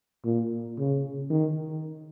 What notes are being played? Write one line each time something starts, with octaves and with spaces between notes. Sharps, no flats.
A#2
C#3
D#3